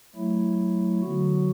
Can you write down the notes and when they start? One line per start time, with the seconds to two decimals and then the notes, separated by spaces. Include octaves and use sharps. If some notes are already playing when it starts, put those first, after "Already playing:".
0.15 F#3 A3 E4
1.02 D3 F#3 B3 F#4